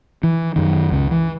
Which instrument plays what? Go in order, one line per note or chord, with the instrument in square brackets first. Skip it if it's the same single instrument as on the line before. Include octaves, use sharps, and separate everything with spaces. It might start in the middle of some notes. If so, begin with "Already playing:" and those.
[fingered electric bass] E3
F#2 D#3
C#2 C#3
E3